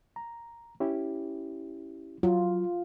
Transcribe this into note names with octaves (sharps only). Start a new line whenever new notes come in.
A#5
C#4 E4 G4
F#3 F4